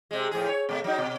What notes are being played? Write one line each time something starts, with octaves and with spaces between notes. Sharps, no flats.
C3 G#3
A2 F3 G#4
C#5
B2 A3
F#3 D#4
B2